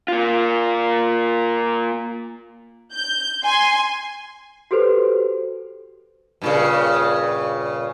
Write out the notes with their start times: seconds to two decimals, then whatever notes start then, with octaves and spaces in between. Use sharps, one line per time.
0.08 A#3 F4
2.93 G6
3.44 G#5 C6
4.71 F#4 G4 A4 B4 C5
6.42 G2 A#2 C#3